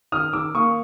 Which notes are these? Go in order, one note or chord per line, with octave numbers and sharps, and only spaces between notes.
D#3 D#6 F6
D#3 D6 E6
A#3 C#6 D#6